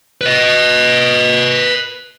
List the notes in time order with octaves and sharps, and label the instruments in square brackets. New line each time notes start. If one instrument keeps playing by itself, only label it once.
[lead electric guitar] B4 D#5